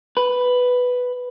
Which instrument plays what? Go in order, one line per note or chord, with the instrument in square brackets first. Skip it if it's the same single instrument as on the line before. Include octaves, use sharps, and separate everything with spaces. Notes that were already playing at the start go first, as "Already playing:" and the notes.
[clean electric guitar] B4